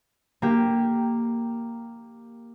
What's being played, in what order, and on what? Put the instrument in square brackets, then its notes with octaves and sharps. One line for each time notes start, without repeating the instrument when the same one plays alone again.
[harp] A#3 G4